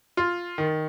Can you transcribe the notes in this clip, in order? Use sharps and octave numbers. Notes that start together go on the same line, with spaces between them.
F4
D#3